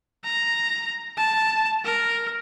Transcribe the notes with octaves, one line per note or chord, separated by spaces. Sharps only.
A#5
A5
A#4